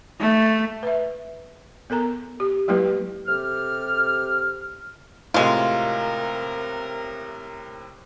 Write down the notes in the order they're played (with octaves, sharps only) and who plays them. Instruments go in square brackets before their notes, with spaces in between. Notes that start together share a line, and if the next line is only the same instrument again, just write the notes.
[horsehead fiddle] A3
[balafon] B4 E5
B3 A4 A#4 A#5
G4
F#3 G#3 A#3 E4 G4 B4
[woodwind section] C3 G4 A4 F6
[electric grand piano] A2 C3 [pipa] G#3 F4 [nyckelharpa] A#4